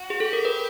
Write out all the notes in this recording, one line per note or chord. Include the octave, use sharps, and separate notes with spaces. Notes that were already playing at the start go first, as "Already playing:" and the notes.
Already playing: F#4
G#4
G4 A4
A#4
B4